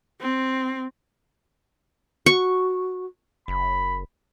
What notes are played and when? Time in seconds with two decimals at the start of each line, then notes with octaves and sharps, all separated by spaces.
0.21 C4
2.26 F#4 C#6
3.48 F#1 B5